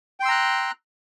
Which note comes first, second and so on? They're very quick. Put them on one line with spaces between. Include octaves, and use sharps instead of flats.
G5 C6 E6 A#5 F#6